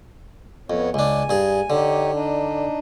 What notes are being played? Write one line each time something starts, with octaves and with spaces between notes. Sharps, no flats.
F2 B3 C#5
C#2 D4 G#5
G2 G#4
D3 D#4 G4 C#5
D4 D#4